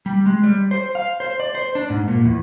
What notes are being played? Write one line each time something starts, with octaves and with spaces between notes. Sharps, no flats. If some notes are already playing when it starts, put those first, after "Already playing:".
G3
G#3
G3
C5
F5
C5
D5
C5
D4
G#2
A#2
E2